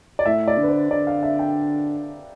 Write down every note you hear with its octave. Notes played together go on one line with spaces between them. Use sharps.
D5
A2 E5
D5
D3 B4
C5
D3 D5
F5
E5
G5